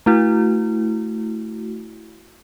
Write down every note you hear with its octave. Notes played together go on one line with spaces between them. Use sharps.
A3 E4 F#4